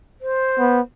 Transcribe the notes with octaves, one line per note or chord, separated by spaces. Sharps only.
C5
B3